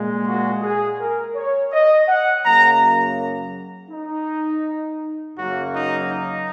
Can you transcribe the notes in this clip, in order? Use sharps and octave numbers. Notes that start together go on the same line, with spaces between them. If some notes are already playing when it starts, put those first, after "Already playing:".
Already playing: A#2 G#3
F#4
G#4
A#4
C#5
D#5
F#5
F#2 C#3 F#3 A#3 A#5
D#4
F#2 C#3 F#3 A#3 F#4
D#4
D#4